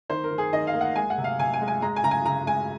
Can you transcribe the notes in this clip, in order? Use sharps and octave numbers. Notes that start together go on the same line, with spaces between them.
D#3 C5
A#4
D#3
G#4
D#3 D#5
F5
A#3
F#5
G#3 G#5
F#5
C3
F5
C3 G#5
G#5
G#3
G#5
G#3 A#5
G#5
C#3 A#5
G#5
C#3 A#5
G#3 G#5